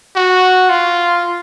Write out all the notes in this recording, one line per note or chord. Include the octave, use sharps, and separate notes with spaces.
F#4
F4